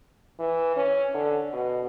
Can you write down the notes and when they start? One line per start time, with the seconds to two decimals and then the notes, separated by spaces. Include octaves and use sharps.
0.39 E3
0.76 C#4
1.14 D3
1.53 B2